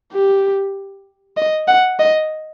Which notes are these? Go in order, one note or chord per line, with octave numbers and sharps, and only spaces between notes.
G4
D#5
F#5
D#5